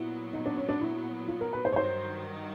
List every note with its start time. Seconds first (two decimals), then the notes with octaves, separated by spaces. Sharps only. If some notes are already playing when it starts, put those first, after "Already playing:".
Already playing: A#2 F#3 B3 E4
0.33 D#4
0.46 D4
0.57 C#4
0.69 D4
0.81 E4
1.28 F4
1.41 A#4
1.53 B4
1.65 C5
1.72 C#5
1.76 G2 D#3 F#3 C5